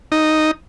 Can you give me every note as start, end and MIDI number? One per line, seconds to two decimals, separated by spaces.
0.12 0.51 63